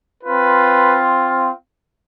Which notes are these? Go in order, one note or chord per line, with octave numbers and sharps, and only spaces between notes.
C4 F4 B4